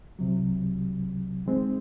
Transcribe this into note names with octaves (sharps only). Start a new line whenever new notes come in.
C2 C3 F#3
D#3 G#3 C4